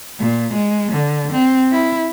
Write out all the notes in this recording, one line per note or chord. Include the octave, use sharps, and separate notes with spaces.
A#2
G#3
D3
C4
E4